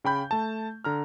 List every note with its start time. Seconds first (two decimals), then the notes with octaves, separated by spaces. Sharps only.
0.04 C#3 G5 B5 G6
0.31 A3 A5
0.84 D3 A#5 F6